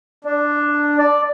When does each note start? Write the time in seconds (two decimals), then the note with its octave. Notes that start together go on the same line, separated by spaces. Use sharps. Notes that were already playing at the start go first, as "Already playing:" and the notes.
0.25 D4
0.98 D5